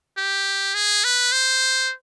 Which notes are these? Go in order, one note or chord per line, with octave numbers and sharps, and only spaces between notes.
G4
G#4
B4
C5